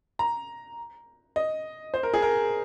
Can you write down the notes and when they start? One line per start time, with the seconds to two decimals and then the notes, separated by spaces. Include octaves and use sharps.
0.19 A#5
1.36 D#5
1.94 C5
2.03 A#4
2.14 G#4
2.22 A#4